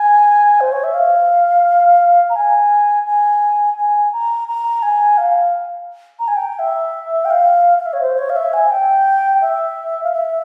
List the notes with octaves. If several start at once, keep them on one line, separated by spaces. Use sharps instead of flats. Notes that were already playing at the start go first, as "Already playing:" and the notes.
Already playing: G#5
C5
C#5
E5
F5
A#5
G#5
G#5
G#5
A#5
A#5
G#5
F5
A#5
G#5
G5
E5
G5
F5
F5
E5
C#5
C5
C#5
F5
E5
G#5
G5
E5
F5
E5